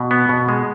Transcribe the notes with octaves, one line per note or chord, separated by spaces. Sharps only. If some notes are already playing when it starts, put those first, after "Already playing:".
Already playing: B2
B3
B2
G#3